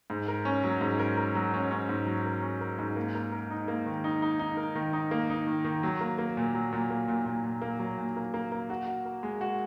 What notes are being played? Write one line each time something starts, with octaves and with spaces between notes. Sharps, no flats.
G#2
A#4
C#4
F#3
G#2
A#4
A#4
F#3
C#4
C#4
G#2
F#3
A#4
C#4
A#4
G#2
A#3
A#3
A#4
D#4
A#3
D#3
D#4
D#4
D#4
A#4
D#3
D#4
A#3
D#4
D#3
D#3
F#3
A#3
A#3
A#2
F#3
A#2
A#3
A#2
A#2
A#2
A#3
F#3
A#2
A#3
A#3
A#3
F#4
F#4
A#4
G#3
F#4